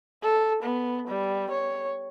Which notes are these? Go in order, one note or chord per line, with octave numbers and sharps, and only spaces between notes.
A4
B3
G3
C#5